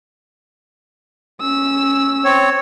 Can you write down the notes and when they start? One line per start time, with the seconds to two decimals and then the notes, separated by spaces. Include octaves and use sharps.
1.41 C#4 E6
2.24 C4 C#5